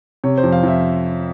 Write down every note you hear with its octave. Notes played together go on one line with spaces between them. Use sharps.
C3 C#5
C5
F2
F5
F2 E5